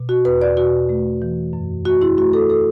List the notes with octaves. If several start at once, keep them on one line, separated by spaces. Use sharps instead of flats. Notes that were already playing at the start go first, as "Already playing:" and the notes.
Already playing: B2
F#4
E2 B4
D5
B2 F#4
A3
E3
F#2
A3 F#4
E4
A3 F#4
A4
A4